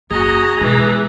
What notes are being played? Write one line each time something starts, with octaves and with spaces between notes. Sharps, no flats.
F#1 F#4 G#4 D#5 A#5
B2 E3 G#3